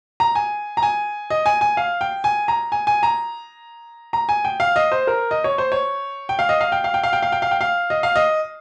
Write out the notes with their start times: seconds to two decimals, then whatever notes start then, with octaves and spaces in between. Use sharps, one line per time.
0.20 A#5
0.35 G#5
0.77 A#5
0.83 G#5
1.30 D#5
1.46 G#5
1.61 G#5
1.77 F5
2.01 G5
2.24 G#5
2.48 A#5
2.72 G#5
2.87 G#5
3.03 A#5
4.13 A#5
4.29 G#5
4.45 G5
4.60 F5
4.76 D#5
4.92 C5
5.07 A#4
5.31 D#5
5.44 C#5
5.58 C5
5.72 C#5
6.29 G5
6.39 F5
6.49 D#5
6.61 F5
6.72 G5
6.84 F5
6.94 G5
7.03 F5
7.13 G5
7.23 F5
7.32 G5
7.42 F5
7.51 G5
7.61 F5
7.90 D#5
8.03 F5
8.16 D#5